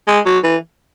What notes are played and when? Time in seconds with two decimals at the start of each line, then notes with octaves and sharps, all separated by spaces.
0.07 G#3
0.26 F#3
0.44 E3